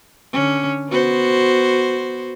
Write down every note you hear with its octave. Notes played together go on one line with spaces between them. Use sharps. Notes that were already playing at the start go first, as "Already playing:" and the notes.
D3 C#4
B3 F#4 C5